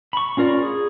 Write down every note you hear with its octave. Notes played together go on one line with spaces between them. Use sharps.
B5 C#6
C#4 F4 A#4 D5
G#4